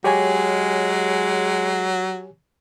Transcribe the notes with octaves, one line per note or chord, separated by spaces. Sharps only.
F#3 G#3 G4 C#5 G#5